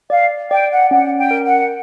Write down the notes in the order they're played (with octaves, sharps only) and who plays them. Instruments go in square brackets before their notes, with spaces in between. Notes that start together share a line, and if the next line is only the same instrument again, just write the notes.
[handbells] D5 [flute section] F5
[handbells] D5 [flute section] G5
[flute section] F#5
[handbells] C#4 [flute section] F#5
[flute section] G5
[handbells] A#4
[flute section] F#5